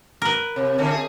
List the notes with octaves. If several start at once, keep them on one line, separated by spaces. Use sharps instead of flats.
A#4 B4
C3
D3 A3 C#4
G#4